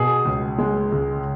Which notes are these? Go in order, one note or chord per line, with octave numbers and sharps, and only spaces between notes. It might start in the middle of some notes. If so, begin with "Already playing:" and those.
Already playing: B2 G#4
C#2
G#3
C#2